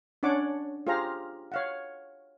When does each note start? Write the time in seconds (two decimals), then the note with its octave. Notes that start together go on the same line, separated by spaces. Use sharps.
0.23 C#4 D4 C#5 F#5 D6
0.87 F4 G4 G#4 C5 F5 A#5
1.52 C#5 F5 F#5